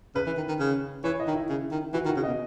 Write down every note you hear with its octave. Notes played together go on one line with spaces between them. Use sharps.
C#3 B4
E3
D#3
D#3
C#3
E3 C#5
D#5
D#3
E4
C#3
D#3
E3 F#4
D#3
F#4
C#3
B2 D#5